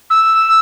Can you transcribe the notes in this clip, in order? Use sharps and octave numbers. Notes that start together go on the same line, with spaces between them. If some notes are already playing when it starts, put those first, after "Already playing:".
E6